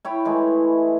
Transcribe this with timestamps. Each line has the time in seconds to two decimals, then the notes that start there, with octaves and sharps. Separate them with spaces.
0.05 E4 C#5 G5 B5
0.25 E3 G#3 A3